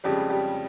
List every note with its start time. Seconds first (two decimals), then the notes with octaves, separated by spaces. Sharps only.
0.04 F2 C#3 G3 G#3 G4
0.30 G3 G4